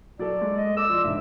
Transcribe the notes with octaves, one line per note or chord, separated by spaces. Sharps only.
F#3 A4 D5
G#3
D#5
A4 D6 E6
F3 D5 C6
G1 G#2 E5